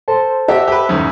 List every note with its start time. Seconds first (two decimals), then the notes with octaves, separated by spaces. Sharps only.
0.08 A4 C5 A5
0.48 F#4 G4 E5
0.68 G4 B4
0.89 E2 G#2 C#3